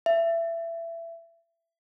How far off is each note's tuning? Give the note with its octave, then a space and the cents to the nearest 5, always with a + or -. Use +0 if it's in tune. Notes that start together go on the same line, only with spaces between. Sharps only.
E5 +20